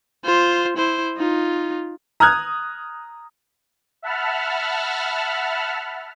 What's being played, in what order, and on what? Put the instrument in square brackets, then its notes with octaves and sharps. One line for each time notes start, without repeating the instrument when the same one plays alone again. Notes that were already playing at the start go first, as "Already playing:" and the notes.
[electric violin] F4 C5
E4 C5
D#4 F4
[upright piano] A#5 D#6 F6 F#6 G#6
[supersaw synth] E5 F#5 A5 B5 F6